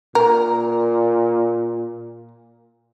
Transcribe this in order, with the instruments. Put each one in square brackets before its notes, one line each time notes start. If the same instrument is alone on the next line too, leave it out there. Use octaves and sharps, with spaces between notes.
[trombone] A#2 [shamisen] A#4